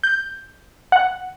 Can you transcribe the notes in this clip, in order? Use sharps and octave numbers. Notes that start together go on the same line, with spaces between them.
G6
F#5